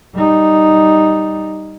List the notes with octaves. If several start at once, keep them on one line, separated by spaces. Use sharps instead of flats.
G3 D#4